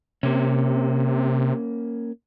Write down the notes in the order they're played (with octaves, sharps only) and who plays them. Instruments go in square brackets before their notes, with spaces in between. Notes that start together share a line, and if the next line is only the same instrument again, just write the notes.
[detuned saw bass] C3 [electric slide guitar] A#3 C#4